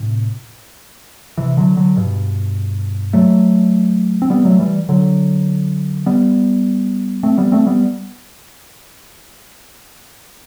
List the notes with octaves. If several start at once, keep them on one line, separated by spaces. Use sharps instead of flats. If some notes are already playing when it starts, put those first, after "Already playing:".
Already playing: A2 C3
C3 E3
D3 F#3
D3 F#3
G2 B2
F#3 A3
C4
G3 B3
F#3 A3
E3 G3
D3 F#3
G3 B3
A3 C4
G3 B3
A3 C4
G3 B3